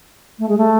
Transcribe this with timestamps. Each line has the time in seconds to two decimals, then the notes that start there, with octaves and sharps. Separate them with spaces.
0.39 A3
0.48 G#3
0.58 A3